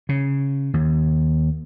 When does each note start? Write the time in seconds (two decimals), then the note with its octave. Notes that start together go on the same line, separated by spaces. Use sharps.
0.09 C#3
0.74 D#2